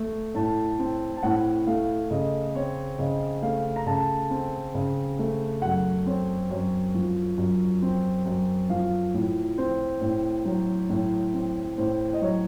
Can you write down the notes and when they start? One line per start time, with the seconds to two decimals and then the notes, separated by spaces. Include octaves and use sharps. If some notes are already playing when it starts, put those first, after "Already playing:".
Already playing: A3
0.35 A2 A5
0.79 C4
1.17 A5
1.23 A2 F#5
1.67 A3 F5
2.11 C#3 D#5
2.55 C4 C#5
2.99 C#3 D#5
3.42 A3 F5
3.76 A#5
3.86 C#3 A5
4.30 C4
4.74 C#3
5.19 A3
5.62 F#2 F#5
6.06 C4 C#5
6.50 F#2 C#5
6.94 F3
7.38 F#2
7.82 C4
8.26 F#2
8.69 F3 F5
9.14 A2
9.58 C4 C5
10.01 A2
10.45 F#3
10.90 A2
11.34 C4
11.78 A2 C5
12.13 D#5
12.21 F#3 C#5